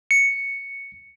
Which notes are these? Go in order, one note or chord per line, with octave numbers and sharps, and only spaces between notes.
C#7